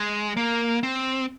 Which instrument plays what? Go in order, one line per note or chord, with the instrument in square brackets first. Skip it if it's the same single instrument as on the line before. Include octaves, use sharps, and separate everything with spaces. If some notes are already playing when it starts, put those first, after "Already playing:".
Already playing: [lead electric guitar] G#3
A#3
C4